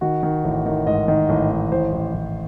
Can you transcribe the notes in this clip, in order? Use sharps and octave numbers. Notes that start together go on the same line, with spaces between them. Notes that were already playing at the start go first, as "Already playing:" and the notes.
D#3 F#4
D#3
A1
D#3
G#2 D#5
D#3
A1
D#3
A1 C5
A1
A1